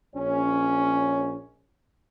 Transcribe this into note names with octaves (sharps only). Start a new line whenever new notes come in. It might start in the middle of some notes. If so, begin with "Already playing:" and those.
A#1 C#4